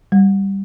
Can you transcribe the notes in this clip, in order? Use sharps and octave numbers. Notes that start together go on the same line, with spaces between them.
G3